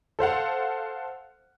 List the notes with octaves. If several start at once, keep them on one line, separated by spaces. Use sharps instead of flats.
A4 C5 F5 F#5